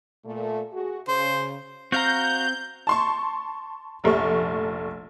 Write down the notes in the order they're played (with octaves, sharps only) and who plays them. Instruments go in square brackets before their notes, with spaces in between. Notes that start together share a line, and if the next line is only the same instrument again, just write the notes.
[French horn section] A#2 A3
F#4 G#4
[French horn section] C#3 [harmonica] C5
[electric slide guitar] C4 [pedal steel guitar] F#4 F5 A#5 [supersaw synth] G6
[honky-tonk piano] A5 C6 C#6
F1 A#1 A3 C#6